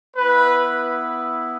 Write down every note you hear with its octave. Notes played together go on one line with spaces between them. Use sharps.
B3 E4 B4